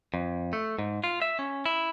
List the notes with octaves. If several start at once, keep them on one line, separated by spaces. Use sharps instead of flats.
F2
A3
G#2
F4
E5
C#4
E4